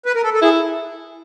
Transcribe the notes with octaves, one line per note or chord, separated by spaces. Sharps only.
B4
A#4
A4
A4
E4 G#4